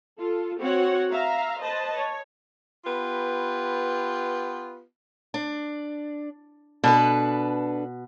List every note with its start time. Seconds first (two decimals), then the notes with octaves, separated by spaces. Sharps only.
0.19 F4 A4
0.58 C4 F#4 C#5 F#5
1.12 E5 F5 A#5
1.61 B4 C5 D#5 A5
1.94 C#5
2.85 B3 F4 G4 B4
5.34 D4
6.84 B2 D4 A4 B4